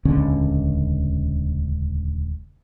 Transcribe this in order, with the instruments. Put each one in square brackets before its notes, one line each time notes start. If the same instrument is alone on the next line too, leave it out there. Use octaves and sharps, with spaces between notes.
[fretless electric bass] D#1 C#2 D3 C#4